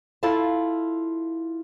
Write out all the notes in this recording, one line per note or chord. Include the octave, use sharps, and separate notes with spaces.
E4 F4 A4 F5 A5